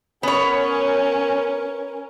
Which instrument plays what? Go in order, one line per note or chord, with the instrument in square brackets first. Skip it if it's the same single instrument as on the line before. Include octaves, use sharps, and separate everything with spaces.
[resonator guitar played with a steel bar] B3 C#5 [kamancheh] C#4 A#4